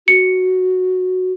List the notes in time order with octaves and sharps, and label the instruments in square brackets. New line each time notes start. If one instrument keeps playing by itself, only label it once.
[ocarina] F#4 [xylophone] C#7